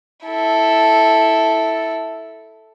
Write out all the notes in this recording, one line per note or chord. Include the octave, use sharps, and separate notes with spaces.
E4 A4